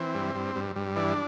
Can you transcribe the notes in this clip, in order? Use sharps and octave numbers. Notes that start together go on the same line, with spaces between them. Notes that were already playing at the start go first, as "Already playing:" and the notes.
Already playing: E3 C4
G2
G2
G2
G2
E3 D4